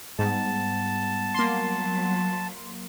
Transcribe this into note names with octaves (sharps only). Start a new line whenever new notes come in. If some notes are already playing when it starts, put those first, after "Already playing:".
G#2 G3 B3 F#5 A5
F#3 A#3 C6